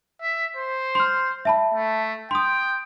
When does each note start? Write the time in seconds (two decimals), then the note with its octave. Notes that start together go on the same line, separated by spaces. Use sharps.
0.21 E5
0.57 C5
0.95 C6 F6
1.45 E5 A5 B5
1.74 A3
2.31 G5 C6 D#6